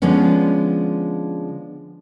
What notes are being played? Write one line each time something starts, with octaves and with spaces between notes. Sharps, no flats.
D3 F3 G#3 B3 C#4